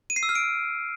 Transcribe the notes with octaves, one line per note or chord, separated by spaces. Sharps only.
D#7
C7
E6
F6
D7